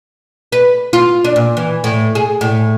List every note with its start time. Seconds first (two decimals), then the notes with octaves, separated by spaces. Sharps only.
0.52 B4
0.93 F4
1.24 D4
1.36 A#2
1.57 E3
1.84 A2
2.15 G#4
2.41 A2